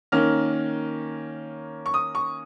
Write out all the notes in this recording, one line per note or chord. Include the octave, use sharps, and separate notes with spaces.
D#3 A#3 C#4 F6
C#6
D#6
C#6